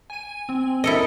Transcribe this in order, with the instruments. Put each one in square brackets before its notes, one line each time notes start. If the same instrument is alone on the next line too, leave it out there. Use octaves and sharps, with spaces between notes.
[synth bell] G#5 D#7
C4
[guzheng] E4 A4 D#5 [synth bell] A#4 C#7